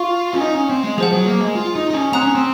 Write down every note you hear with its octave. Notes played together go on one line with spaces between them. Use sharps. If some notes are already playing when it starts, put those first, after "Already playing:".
Already playing: F4 F5 C#6
C#4
D#4
C#4
C4
G#3
F3 G#4 C5 F#5
F#3
A#3
G#3
F4
D#4
D#4
C#4
C4 F#5 A#5 D#6 F#6
C#4
C4